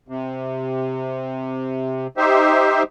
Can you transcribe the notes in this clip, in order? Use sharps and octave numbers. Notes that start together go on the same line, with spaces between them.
C3
D#4 G4 C5 E5